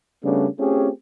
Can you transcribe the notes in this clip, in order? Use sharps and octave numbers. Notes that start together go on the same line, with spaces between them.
C#3 G3 A3 B3 C#4 D4
A3 C4 C#4 F4 G4 G#4